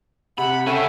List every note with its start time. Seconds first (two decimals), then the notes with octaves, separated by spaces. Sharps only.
0.38 C3 F#5 B5
0.67 C#3 C#4 A4 E5 G5 C#6